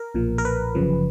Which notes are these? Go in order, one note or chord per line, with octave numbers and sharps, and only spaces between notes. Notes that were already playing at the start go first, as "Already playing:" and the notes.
Already playing: A#4
B1 A#2 F3
A#4
B4
G1 F#2 C#3 F3